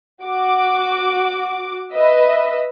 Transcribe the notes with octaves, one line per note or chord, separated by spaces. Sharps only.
F#4 D6
B4 D#5 E5